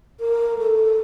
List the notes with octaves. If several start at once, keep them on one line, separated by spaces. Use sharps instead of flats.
A#4
A4